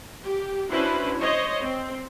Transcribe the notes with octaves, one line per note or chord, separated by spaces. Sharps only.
G4
C#4 D4 E4 F#4 B4 C5
C5 C#5 D#5
C4